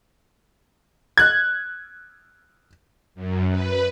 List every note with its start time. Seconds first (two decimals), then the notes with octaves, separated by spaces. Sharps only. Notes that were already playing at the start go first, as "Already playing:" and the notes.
1.18 F#6 G#6
3.15 F#2
3.49 B4